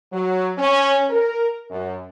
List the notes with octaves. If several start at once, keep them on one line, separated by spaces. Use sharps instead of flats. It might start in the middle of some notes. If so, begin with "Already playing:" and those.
F#3
C#4
A#4
F#2